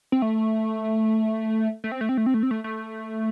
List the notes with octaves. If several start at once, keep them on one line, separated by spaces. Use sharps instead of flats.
C4
A3
A3
C4
A3
C4
A3
C4
A3
C4
A3
A3